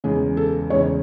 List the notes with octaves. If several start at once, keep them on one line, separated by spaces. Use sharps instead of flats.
E2 C#3 G#3 G#4
A4
E2 C#3 G#3 C#5